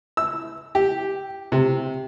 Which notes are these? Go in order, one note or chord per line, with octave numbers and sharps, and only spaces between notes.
E6
G4
C3